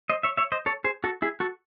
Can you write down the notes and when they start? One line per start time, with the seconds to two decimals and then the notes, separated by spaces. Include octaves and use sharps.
0.10 C5 D#5
0.23 C#5 E5
0.37 C#5 E5
0.52 C5 D#5
0.66 A4 C#5
0.84 G#4 C5
1.04 F#4 A4
1.22 E4 G#4
1.40 F#4 A4